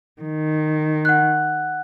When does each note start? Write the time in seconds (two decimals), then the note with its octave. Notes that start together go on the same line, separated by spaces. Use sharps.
0.22 D#3
1.05 F#5 F#6